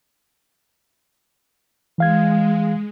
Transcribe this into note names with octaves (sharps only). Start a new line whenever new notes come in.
E3 G#3 F5 G#6